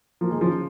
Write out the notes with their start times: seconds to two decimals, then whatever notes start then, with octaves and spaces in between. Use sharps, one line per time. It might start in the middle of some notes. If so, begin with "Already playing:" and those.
0.21 F3 A#3
0.31 D#3 G#3
0.41 C#3 F3